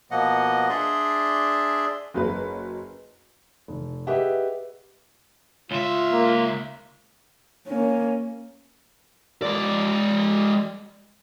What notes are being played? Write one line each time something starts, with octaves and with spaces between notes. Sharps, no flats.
B2 F3 A#3 D#5 F#5
D4 G#4 D5 E5 C6
F#1 F#3 B4
F1
G4 G#4 B4 D#5 E5 F#5
C#2 F4 E5
A#3
A#3 C#4
G#3 D5